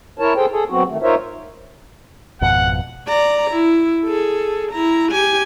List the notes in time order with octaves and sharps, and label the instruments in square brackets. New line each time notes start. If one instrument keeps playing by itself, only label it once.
[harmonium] E4 A#4 C#5 A5
G#4 A4 C5 G5
G#4 A4
F#3 B3 C4 F#4
D#3 A3
D#4 F4 A#4 C5 C#5 E5
[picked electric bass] G#1 F2 B2 [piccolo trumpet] F#5
[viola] D5 A#5
E4
G#4 A4
E4 A#5
G4 G#5